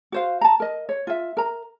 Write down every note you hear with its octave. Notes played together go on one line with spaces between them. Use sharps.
F#4 C5 F5
A5 A#5
A#4 D#5
C#5
F4 E5
A#4 A#5